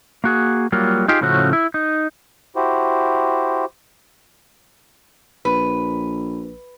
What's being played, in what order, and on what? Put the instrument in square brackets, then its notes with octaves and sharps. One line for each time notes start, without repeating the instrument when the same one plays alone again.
[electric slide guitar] A#3 F#4 G#4
F#3 G3 A#3 F4
D#4 F4 G4 G#4
A2 C#3 F3 A3 C#4 F#4
E4
D#4
[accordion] E4 F#4 G4 C5
[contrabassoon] A#1 [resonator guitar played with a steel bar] B4